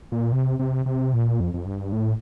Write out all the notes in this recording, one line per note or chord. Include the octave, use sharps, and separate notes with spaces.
A#2
C3
C3
C3
A#2
F2
F2
G2
A2